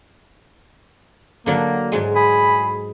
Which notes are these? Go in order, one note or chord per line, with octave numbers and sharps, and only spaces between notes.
D3 F#3 A#3 D5
G#2 F#3 G#3
G#4 B5